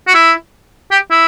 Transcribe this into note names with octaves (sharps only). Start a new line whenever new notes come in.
F#4
E4
G4
E4